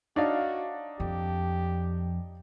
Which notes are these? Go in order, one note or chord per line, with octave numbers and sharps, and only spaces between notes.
D4 D#4 F#4 C#5 F5
F2 G4